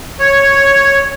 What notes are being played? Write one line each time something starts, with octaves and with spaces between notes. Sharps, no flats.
C#5